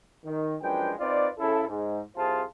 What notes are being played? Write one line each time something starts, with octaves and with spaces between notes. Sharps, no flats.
D#3
F#2 F3 G#3 D4 B4 G5
C4 D#4 F4 B4 D5
C#3 E4 A4
G#2
C2 C3 F4 G#4 C5 A5